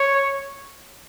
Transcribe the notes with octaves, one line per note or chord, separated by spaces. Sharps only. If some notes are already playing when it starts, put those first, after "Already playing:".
Already playing: C#5